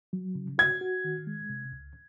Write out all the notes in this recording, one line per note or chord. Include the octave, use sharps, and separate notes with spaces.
F#3
C#3
F#4 G#6
F#4
D#3
G#3
C3
C#2